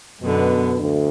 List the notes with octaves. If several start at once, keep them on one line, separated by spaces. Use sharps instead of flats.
F#2 B2 D3 B3
D2 D3